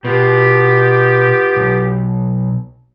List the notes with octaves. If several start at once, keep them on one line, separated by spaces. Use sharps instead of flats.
B2 B3 F4 G4
B1